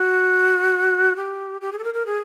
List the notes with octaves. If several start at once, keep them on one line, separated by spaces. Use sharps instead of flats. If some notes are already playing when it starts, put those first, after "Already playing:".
Already playing: F#4
G4
G4
G#4
A4
A#4
A#4
G#4